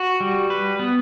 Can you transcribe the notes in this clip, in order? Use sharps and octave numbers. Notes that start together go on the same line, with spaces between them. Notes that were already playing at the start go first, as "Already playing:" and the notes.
Already playing: F#4
G3
B4
B3